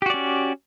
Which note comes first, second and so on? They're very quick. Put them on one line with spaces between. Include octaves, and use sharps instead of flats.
G4 F#4 D5 C#4